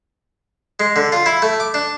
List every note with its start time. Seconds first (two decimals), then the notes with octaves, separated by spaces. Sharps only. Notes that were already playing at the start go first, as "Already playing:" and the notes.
0.80 G#3
0.96 D3
1.12 F4
1.26 E4
1.42 A3
1.60 D6
1.74 D4